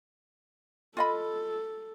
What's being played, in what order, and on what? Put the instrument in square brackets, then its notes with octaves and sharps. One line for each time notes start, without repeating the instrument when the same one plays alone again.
[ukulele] F4 D#5 B5 [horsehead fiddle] A4